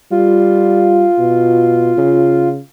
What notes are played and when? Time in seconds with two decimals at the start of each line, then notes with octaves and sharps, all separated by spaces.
0.11 G3 F4
1.18 B2
1.98 C#3